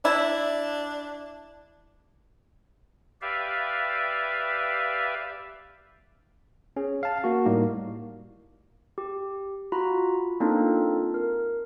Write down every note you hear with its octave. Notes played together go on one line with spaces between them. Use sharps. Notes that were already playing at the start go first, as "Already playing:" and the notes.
D4 E4
G4 B4 D5 E5 F5
C#4 G#4
F5 A5
A#3 F#4
A2 G3 A#3 D#4
G4
F4 F#4 A#5 B5
A#3 C4 D4 D#4 F4 A4
A#4